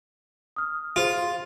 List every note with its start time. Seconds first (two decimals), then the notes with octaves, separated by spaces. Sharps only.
0.56 D#6 F6
0.96 F4 G#4 C5 C6